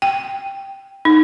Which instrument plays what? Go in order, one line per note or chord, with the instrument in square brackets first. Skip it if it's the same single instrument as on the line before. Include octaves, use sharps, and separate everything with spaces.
[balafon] G5
D#4